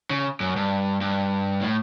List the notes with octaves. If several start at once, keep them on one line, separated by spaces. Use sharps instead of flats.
C#3
F#2
G2
G2
A2